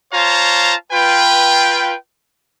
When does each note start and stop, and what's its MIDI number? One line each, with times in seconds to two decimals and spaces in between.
0.13 0.73 65
0.13 0.73 72
0.13 0.73 73
0.13 0.73 77
0.13 0.73 81
0.13 0.73 82
0.92 1.94 65
0.92 1.94 71
0.92 1.94 79